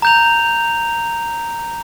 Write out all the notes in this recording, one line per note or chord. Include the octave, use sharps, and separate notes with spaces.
A#5 G6 F7